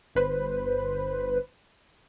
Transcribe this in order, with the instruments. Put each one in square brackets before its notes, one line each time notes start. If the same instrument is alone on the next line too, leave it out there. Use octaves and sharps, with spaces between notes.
[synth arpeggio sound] G1 B4 C5